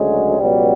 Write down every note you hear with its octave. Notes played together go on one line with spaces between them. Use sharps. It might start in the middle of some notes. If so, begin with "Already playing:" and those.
Already playing: D2 C#3 F#3 G#3
C#2 B2 F#3 G3